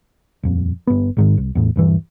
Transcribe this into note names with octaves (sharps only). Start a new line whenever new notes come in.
D#1 F2
G1 B3
G#1 G#2 D#3
C2
E2 A2
D#1 G2 E3